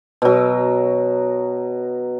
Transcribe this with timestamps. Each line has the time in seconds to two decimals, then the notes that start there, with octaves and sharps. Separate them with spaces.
0.22 B2 F#3